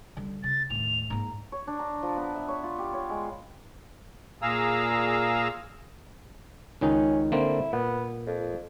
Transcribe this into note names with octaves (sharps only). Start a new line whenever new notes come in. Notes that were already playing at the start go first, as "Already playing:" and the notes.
D3 G3
C#3 A6
D#2 A2 F7
G#2 A#3 A#5
C#5
D4
A#5
F3
B3
E5
C#5
F4
G4
C#5
G#3
A#2 G#4 F5 A#5 E6
C#2 D#3 C#4 D#4
D3 A#3 C4 E4
A#2 B3
F2